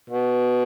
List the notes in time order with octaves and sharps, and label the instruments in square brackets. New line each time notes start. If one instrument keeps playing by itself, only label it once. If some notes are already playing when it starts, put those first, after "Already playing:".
[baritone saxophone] B2